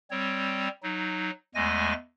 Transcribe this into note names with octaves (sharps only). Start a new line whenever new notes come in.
G3 C4 C#5
F#3 D#4
E2 G#3 A3 G#5 A#6